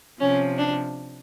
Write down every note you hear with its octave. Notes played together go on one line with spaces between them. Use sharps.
C3 F3 C#4
D4